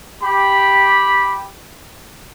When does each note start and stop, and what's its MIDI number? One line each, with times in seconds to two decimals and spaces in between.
0.23 1.51 67
0.23 1.51 83